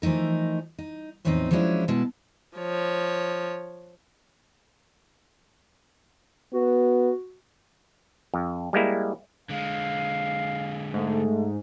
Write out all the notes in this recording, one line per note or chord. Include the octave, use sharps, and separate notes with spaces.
E3 F3 A3 D#4 A#4
D#4
E2 A2 F3 B3 C4 D#4
F3 F#3 G#3 C#4 D4 E4
B2 G#3 E4 F#4 A5
F3 C#5
B3 F#4
F2
G3 G#3 A#3 E4
D3 G#3 F5
G#2 A3